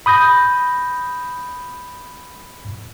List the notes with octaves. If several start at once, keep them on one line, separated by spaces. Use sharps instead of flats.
B5 D#6 G6 A#6